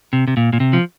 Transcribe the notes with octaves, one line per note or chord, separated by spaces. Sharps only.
C3
C3
A#2
A#2
C3
F3